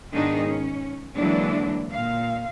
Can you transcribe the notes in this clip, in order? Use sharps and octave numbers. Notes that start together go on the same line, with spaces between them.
G#2 B2 D#3 D4 D#4 G#4
C#4
D3 E3 F#3 G#3 A#3 D4
A#2 F5